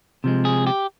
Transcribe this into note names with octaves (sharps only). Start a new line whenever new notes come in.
C3 F3 G#3
G#4
G4